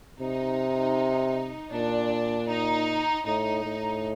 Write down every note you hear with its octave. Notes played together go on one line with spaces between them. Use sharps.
C3 D#4
A#2 D4
D#4
A2 D#4
A2